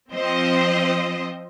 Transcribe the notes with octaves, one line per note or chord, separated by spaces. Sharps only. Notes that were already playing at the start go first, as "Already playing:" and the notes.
F3 C4 C5 D#5